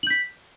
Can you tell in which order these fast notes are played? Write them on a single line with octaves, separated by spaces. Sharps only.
F#7 G6 B6